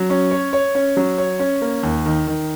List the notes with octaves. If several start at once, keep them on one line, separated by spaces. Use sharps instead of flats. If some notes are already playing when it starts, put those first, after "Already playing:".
Already playing: F#3
C#4
C#5
C#5
C#4
F#3
C#5
C#4
A#3
D#2
D#3
D#3